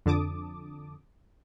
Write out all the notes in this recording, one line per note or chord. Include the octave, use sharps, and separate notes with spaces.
F2 D3 A5 D6 D#6